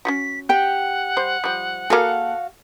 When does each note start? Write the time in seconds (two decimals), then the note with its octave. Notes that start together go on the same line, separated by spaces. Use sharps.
0.05 C#4 F4 F#4 B6
0.49 G4 F#5 G5
1.17 G3 C5
1.44 F3 G3
1.90 A#3 F#4 G#4 A4 F5